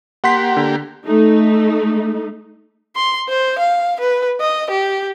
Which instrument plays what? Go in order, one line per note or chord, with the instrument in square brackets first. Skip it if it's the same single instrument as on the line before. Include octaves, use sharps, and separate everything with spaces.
[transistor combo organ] A#3 G4 [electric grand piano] F#5 C6 B6
[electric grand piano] D3
[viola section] A3 D#4
[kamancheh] C6
C5
F5
B4
D#5
G4